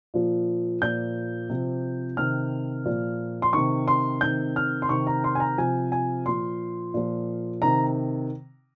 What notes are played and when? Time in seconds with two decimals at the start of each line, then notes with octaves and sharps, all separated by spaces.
0.14 A#2 F3
0.82 A#2 F3 G6
1.49 C3 F3
2.17 C3 D#3 F6
2.85 A#2 F3
3.42 C6
3.53 C3 D#3 C#6
3.88 C6
4.21 C3 D#3 G6
4.56 F6
4.82 C6
4.89 C3 D#3 C#6
5.07 A#5
5.24 C6
5.35 G#5
5.40 A#5
5.58 C3 F3 G#5
5.92 G#5
6.26 A#2 F3 C6
6.94 A#2 F3
7.62 C3 D#3 A#5